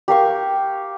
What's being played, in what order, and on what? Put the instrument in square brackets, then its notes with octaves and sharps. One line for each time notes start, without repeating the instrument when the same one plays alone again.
[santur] G4 A#4 F5 C#6